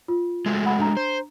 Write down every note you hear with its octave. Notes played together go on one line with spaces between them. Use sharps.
F4
G#3 A3 F#4
F#5 B5
D4 A#5
C5